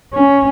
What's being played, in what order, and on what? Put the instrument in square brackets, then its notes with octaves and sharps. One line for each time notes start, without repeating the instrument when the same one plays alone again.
[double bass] C#4